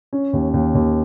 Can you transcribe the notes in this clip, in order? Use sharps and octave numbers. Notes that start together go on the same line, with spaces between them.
C#4
D#2
D#2
D#2